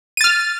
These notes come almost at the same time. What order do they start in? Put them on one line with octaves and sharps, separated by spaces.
D#7 A6 F6